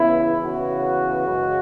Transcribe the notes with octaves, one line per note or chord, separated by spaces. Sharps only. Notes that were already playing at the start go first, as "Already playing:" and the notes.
Already playing: C#3 E3 B3 E4
C#3 E3 B3 F#4
F#2 C#3 G#3